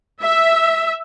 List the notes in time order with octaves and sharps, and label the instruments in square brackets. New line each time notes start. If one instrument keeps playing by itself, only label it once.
[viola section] E5